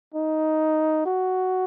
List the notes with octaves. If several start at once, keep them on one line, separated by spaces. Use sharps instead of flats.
D#4
F#4